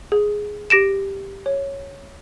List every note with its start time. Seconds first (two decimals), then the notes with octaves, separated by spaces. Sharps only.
0.12 G#4
0.70 G4 A#6 D7 E7
1.46 C#5